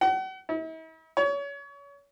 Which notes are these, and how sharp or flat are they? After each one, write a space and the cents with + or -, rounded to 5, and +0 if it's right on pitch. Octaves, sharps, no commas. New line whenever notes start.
F#5 +40
E4 -45
C#5 +30